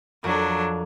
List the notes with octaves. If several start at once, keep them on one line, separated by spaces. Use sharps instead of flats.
F2 F#3 D4 A#4